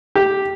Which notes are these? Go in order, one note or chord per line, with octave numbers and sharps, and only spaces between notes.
G4